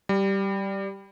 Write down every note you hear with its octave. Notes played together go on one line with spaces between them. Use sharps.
G3